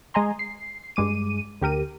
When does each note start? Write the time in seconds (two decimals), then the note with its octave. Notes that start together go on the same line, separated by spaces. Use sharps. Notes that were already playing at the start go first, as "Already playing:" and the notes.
0.14 G#3 D#5 G#5 A#5 C6
0.39 C7
0.96 G2 G#3 D6 D#7
1.61 D2 G4 A#4 D#7